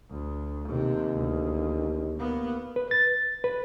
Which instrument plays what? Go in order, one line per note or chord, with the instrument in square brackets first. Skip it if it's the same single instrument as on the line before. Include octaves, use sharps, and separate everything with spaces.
[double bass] D2
[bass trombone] D#2 [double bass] C3
[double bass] D2
A#3 B3
[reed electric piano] B4
A6
B4